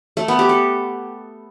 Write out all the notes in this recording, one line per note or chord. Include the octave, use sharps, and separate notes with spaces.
A3
B3
G4
A4